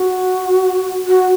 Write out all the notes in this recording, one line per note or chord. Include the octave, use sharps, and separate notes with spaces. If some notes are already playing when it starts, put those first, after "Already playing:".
Already playing: F#4
F#4